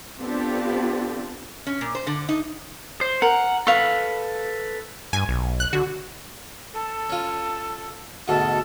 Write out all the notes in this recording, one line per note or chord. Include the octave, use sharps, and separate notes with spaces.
B3 C4 D4 F4 G4 A4
C#4
A#2
C5
D3
D#4
C5
A#4 F#5
A4 B4 F5 C#6
G2 G#5
B1
F#6
D3 F#4
A4
C#4 F4
D2 G#2 B2 A4